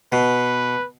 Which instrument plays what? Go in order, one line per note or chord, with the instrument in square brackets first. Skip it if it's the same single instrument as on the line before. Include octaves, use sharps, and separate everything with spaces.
[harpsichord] B2 [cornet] B4